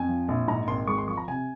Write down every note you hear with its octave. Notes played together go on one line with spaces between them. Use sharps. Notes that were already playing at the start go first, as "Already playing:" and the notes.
Already playing: F2 G#5
F3
A#1
G#2 A#5
G#1 C6
G#3 C#6
C6
F3 C#6
A#5
C3 G#5